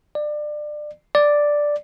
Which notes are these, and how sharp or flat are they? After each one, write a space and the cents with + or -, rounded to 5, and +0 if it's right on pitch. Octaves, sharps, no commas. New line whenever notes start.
D5 +25
D5 +0